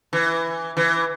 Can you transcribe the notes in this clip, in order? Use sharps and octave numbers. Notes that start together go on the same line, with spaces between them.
E3
E3